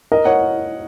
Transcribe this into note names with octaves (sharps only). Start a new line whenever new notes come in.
A#4 D#5
C#5 F#5